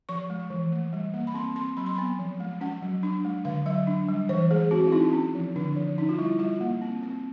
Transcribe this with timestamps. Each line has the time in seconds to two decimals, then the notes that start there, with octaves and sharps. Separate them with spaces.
0.09 F3 C#6
0.30 G#3
0.50 E3
0.72 A3
0.93 G3
1.14 A#3
1.27 B5
1.35 C4 C6
1.56 C4 C6
1.77 F#3 B5
1.86 C6
1.95 B3 B5
2.19 F3
2.40 G#3
2.61 C#4 F#5
2.82 F#3
3.03 D4
3.25 G#3
3.45 D3 F5
3.66 F#3 E5
3.87 D4
4.08 G3
4.29 E3 C5
4.50 G#3 G#4
4.71 C4 F#4
4.87 E4
4.92 C4 D#4
5.13 C#4
5.35 F3
5.56 D3 D4
5.76 F3
5.98 C#4 D#4
6.09 F4
6.18 G3 E4
6.39 G3 F4
6.61 A#3
6.82 C4
7.03 C4